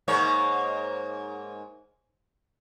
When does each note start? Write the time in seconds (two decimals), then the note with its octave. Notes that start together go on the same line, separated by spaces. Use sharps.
0.08 G#2 A#3 C#5